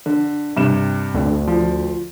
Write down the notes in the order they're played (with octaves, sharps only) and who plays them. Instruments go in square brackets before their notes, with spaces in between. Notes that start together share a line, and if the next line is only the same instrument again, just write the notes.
[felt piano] D3
G2 C3 E7
[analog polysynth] D2
[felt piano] F3